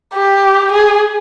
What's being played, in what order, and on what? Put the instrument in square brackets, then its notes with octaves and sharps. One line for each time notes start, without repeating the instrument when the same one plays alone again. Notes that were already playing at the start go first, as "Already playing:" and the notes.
[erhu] G4
G#4